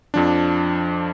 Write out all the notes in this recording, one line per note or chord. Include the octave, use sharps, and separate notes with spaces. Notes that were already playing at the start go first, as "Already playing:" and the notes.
F2 F3 D4